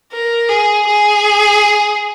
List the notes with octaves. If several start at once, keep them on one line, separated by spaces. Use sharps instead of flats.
A#4
G#4
G#4